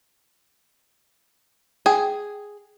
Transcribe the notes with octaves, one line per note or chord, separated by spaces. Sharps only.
G#4 G5